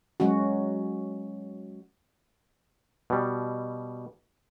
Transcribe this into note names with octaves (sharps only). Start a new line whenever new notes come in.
F#3 G#3 C#4 F#4
B2 G3